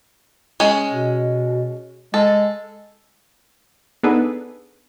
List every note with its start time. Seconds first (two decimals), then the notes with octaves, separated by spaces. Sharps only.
0.60 G#3 C#4
0.91 B2
2.14 G#3 A4
4.03 B3 D4 D#4 G#4 A4 B4